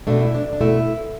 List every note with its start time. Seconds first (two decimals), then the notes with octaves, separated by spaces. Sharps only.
0.07 B2 A3 D4
0.21 E4
0.35 D4
0.53 D4
0.61 B2 A3 E4